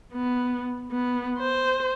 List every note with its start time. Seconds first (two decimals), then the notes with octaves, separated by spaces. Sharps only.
0.13 B3
0.91 B3
1.39 C5